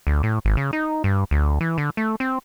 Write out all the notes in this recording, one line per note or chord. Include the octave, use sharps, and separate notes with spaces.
D2
A2
G#1
C#3
D#4
G2
D2
E3
D3
A3
C4